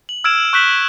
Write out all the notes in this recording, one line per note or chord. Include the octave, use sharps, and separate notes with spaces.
F#7
E6 F6 G#6 D7 E7
C#6 F#6 G6 B6 E7 G7